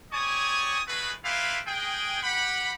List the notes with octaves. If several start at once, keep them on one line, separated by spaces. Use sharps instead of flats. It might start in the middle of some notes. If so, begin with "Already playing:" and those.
G4 C#5 D5 G#5 C#6 D#6
G#3 A3 F#4 G#4 B4
A#3 E4 F4 G4 B4 F5
G#3 G#4 G5
G4 F#5 B5